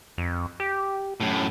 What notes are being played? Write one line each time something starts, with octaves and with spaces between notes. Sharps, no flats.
F2
G4
F#2 A2